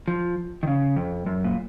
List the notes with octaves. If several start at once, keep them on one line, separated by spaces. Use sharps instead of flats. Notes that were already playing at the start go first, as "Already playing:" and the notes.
F3
D#3
C#3
F2
F#2
A#2